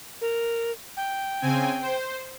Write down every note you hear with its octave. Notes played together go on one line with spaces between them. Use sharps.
A#4
G5
C#3 C4 G#5
C5